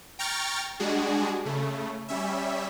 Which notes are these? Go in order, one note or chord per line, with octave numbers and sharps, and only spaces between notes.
G5 A#5 C#6 F6 A6
G3 G#3 D4 F#4 G#4
C#3 A3
G3 C#4 E5